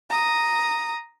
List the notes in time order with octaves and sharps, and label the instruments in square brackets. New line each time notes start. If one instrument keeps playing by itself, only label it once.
[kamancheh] A#5 D#6